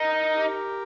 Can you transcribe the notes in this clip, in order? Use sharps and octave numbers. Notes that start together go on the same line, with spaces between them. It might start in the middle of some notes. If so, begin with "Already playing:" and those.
Already playing: D#4 A#4
G4